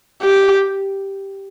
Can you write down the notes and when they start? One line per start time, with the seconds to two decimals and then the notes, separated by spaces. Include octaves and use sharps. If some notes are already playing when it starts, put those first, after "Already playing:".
0.22 G4